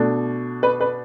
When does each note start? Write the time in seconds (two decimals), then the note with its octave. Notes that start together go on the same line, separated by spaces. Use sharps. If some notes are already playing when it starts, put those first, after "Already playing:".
Already playing: B2 A3 D4
0.63 B4
0.81 B4